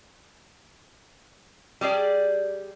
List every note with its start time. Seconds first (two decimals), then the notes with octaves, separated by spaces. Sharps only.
1.81 G3 G4 G#4 D5